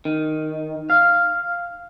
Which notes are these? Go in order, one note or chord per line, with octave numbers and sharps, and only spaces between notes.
D#3
F5